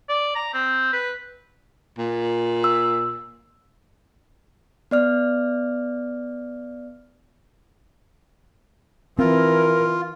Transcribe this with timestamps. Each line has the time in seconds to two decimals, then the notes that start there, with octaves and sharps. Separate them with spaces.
0.09 D5
0.36 A#5
0.54 C4
0.93 B4
1.98 A#2
2.64 E6
4.91 B3 D5 F6
9.19 E3 C4 F4 A#4